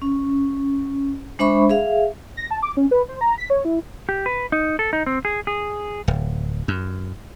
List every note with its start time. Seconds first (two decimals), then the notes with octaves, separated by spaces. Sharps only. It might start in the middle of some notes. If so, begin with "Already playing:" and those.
0.02 C#4
1.39 G#3 D4 C5 E5 B5 C#6
1.69 G#4 E5 F5
2.37 A#6
2.51 A5
2.63 D6
2.77 C#4
2.91 B4
3.09 C5
3.21 A#5
3.38 B6
3.50 C#5
3.65 E4
4.09 G4
4.26 B4
4.52 D#4
4.79 A4
4.93 D#4
5.06 C4
5.25 G#4
5.47 G#4
6.08 D1
6.68 F#2